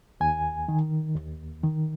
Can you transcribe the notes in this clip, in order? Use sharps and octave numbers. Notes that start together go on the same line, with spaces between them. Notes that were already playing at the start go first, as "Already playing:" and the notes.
D#2 G#5
D#3
D#2
D#3